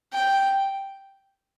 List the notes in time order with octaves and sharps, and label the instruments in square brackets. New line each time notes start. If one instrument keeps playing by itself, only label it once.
[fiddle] G5